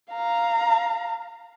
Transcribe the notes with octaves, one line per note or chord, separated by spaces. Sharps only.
F5 A#5